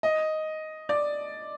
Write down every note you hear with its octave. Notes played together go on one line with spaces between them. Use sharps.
D#5
D5